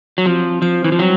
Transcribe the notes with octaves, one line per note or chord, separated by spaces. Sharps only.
F#3
F3 C4
F3 C5
E3
F3
F#3 G3